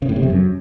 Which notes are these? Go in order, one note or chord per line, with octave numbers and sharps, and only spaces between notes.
C#3
A2
C3
F2
F#2